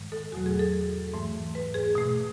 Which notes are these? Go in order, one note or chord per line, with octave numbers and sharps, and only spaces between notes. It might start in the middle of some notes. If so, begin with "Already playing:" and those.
Already playing: G#2 D#3 G#3
A4
E2 B2 F#3 A3 F#4
G#4
A4
G#2 E3 A3
B4
G#4
B2 A3